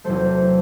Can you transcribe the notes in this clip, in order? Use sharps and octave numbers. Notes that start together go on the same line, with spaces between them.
E2 C3 F#3 A3 A4 C5